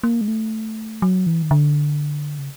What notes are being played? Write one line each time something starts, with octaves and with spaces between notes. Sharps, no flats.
A#3
G#3
A3
F#3
E3
D#3
D3
C#3